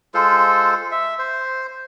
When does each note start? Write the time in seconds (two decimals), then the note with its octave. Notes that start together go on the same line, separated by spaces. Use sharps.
0.14 G#3 F4 A4 C5
0.91 E5
1.19 C5